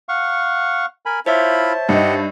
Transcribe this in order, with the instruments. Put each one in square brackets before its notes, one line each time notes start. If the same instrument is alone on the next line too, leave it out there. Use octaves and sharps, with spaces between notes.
[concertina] F5 F#5 C#6
A#4 G#5 B5
[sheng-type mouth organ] E4 F4 B5 [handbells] C5 C#5 E5 [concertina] A5
[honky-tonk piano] G2 D#4 [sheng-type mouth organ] G4 D#5 F#5